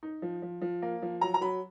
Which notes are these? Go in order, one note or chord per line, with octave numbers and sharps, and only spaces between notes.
D#4
F3
F3
F3
A#3
F3
F#3 A#5
A#5
F#3 B5